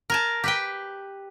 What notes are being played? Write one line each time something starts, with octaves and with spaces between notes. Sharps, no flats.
A#4 G#5 A5
G4 B4 G5